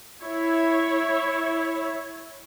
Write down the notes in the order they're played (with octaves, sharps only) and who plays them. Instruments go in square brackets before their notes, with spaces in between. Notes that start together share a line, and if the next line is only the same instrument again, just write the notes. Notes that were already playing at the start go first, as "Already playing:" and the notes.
[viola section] E4 C#5